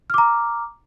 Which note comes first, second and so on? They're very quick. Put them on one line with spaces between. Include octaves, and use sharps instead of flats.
F6 D6 A#5